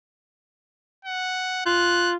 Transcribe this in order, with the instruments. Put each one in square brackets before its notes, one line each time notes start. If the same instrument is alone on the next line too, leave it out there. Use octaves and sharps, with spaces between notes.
[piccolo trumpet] F#5
[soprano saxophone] F4 [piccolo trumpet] F#6